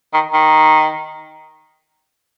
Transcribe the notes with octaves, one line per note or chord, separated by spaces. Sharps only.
D#3
D#3